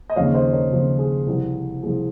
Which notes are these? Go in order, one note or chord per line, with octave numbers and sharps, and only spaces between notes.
D#5
D#2 C#3 F3 C4 C#5 F5
C5 D#5
A#4 C#5
D#2 C#3 F3 C4
G#4
C2 C3 F3 G4
C2 C3 F3 G#4